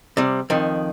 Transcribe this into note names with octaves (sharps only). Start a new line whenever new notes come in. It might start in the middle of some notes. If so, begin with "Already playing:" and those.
C3 G3
F2 D#3